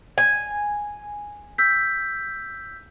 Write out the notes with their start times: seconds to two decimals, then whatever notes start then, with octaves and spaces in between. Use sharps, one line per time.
0.18 G#5
1.58 E6 G6 B6